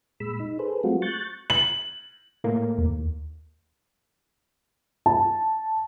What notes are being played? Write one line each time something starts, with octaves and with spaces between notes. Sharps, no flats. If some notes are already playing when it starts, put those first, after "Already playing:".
A#2 G#3 B5 E6
D#4
G#4 A4 B4 C5
F#3 G#3 A3 C4 F4 F#4
C#6 F#6 G6 A6
F#7
A2 A#3
D#2
A5